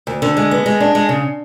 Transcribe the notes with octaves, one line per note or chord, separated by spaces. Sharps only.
D2
D3
G#3
B3
G#3
D4
G#3
C#3